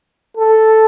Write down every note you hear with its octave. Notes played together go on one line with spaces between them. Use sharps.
A4